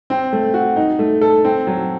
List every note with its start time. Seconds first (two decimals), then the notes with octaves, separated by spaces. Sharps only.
0.10 C4
0.33 A3
0.54 F#4
0.76 D#4
0.99 A3
1.21 A4
1.45 C4
1.67 F#3